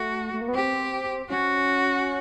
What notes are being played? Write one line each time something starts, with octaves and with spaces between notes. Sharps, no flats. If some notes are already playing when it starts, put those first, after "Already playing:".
Already playing: A3 F#4
A3
A#3
B3
C4 G4
C#4 F#4